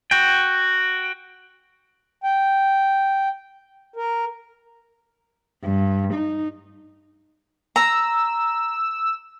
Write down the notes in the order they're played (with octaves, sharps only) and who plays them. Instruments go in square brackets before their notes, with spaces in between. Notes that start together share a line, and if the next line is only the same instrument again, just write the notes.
[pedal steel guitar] F#4 G5
[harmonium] G5
A#4
[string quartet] G2
D#4
[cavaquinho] A#5 [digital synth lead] E6